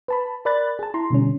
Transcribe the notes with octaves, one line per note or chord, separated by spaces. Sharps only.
B4 A5 B5
A#4 D5 B5 F#6 A6
G#4 A5
E4 A#5 C6
B2 D3 G3 C#4